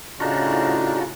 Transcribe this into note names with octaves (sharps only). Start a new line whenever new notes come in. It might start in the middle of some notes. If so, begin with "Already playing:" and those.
A2 C#3 D4 D#4 F4 F#4